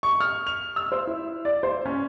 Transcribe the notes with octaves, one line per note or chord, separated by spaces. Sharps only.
C#6
F6
F7
E6
C5
E4
D5
C5
C#4